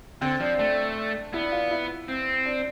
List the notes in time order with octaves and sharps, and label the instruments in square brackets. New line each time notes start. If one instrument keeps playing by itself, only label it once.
[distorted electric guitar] D3 [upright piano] C4
[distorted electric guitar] F3 [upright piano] D4
[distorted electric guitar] A3 [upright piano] D4
[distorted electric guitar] B3 [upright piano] E4
[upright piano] F4
E4
[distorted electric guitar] C4
[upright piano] D4